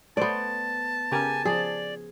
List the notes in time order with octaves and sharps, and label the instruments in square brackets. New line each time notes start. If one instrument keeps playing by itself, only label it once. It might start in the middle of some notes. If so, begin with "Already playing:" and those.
[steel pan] A3 C5 [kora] B3 D5 [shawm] A5
[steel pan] C#3 G4 A#4 [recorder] G#5
[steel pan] F3 [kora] G#4 [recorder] D5